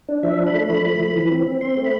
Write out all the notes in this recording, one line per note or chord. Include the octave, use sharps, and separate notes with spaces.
D4
F3 E5
D4
B5
A3
F3 B5
A3
F3
E3
C4
C4
C4 C6
A3
B5